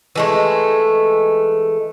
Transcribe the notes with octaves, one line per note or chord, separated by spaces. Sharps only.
E3 G#3 A3